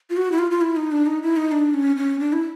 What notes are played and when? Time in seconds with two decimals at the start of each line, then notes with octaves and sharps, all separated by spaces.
0.10 F4
0.17 F#4
0.32 E4
0.39 F4
0.51 F4
0.61 E4
0.76 D#4
0.92 D4
1.06 D#4
1.22 E4
1.36 D#4
1.52 D4
1.74 C#4
1.96 C#4
2.20 D4
2.33 E4